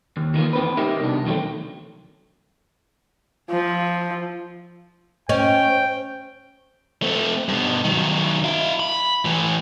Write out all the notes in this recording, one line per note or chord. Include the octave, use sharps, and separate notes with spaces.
D#2
D#3 E3 A#3 F4
E2 C4 B4
D#4 G4 A#4 D#5 E5
C2 B2 D4
E2 B2 D#3 F#3 A3 C4
F3
C#4 C5 D#5 G5
A3 C4
G2 B2
D#3 F#3
E4 F5
B5
A2 E3